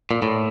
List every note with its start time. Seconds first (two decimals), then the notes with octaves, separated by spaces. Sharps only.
0.11 A#2
0.22 A2